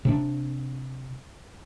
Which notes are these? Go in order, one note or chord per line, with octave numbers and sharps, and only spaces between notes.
C3 C4 D4